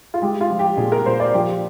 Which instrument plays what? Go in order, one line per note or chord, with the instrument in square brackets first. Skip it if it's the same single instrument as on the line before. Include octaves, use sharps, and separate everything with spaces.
[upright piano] F4
G#3 G4
F4
F3
G4
A#2 G#4
A#4
A#2 C5
D5
F3 G4